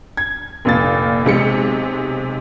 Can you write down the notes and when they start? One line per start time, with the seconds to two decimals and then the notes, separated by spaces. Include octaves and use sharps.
0.17 G#6
0.65 F1 A#2 A6
1.25 B1 C3 G#3 C#7